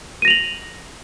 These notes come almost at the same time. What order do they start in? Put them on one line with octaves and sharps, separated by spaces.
D#7 A#6 F7 F#7